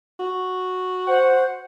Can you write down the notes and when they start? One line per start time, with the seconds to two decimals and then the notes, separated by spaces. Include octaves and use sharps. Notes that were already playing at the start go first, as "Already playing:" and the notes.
0.20 F#4
1.08 C5 F#5